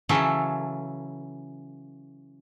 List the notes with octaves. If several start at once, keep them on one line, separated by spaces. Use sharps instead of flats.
C#3 E3 F#3 C#4 E4 A4